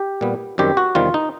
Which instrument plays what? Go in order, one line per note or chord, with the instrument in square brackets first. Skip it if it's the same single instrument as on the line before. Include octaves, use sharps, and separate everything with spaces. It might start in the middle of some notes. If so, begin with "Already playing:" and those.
Already playing: [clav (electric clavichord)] G4
A#2 G3 B3
F#2 D#3 G3 C4 G4
F#4
E2 C3 D#3 G3 C4 F4
D#4